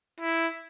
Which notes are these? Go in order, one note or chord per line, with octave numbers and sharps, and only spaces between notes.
E4